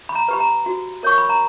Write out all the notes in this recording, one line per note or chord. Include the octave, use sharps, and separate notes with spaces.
B5
A#5
G4 B4 B5
A#5
F#4
A#4 C#5 C#6
B5
A#5